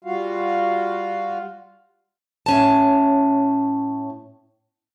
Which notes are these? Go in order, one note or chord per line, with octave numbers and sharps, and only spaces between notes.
G3 F4 F#4 F5
A2 C#4 A5